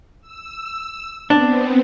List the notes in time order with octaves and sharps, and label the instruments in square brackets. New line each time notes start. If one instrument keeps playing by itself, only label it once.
[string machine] E6
[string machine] B3 C4 [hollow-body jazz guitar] D4